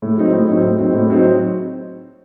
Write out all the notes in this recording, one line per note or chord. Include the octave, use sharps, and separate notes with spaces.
A2
F#3 C4 D#4
A2
F#3 C4 D#4
A2
F#3 C4 D#4
A2
F#3 C4 D#4